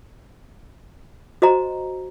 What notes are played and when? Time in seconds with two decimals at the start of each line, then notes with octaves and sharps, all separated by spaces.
1.42 F#4 C5 D#5 A#5